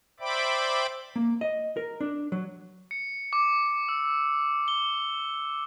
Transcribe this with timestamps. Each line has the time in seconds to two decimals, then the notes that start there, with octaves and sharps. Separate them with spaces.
0.20 C5 D5 E5 G5 B5 D6
1.16 A#3
1.41 D#5
1.77 A#4
2.01 D4
2.32 F#3
2.91 C#7
3.33 D6
3.89 E6
4.68 G7